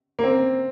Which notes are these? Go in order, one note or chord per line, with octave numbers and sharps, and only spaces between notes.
A#3
C4